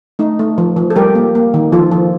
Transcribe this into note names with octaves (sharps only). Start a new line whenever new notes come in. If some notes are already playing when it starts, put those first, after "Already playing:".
A3 D#4
A3
F3
F3
A4
G3 G4 A#4
A#3
A#3
D#3
F3 F4 A4
F3